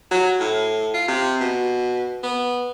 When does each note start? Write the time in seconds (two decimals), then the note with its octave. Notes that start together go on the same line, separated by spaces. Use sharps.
0.11 F#3
0.39 A2
0.94 F4
1.08 C3
1.41 B2
2.23 B3